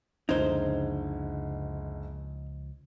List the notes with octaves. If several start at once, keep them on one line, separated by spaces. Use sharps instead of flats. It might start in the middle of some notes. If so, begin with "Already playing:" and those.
F#1 C#2 D3 F3 D#4 C5 G#6